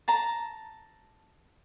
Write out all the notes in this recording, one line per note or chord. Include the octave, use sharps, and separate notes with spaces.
A5 A#5